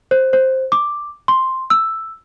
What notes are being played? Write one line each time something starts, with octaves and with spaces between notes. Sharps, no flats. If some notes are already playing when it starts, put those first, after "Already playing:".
C5
C5
D6
C6
E6